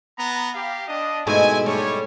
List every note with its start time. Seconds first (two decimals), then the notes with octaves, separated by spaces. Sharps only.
0.18 B3 A#5
0.55 G4 F5
0.88 D4 D#5
1.27 G#2 B2 A3 C4 E4 G#5
1.66 G3 A3 C#5